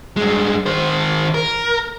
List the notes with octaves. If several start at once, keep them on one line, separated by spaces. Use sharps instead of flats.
G2 G#3
D#3 C5
A#4